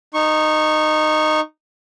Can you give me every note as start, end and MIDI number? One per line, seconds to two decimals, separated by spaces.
0.14 1.40 63
0.14 1.40 85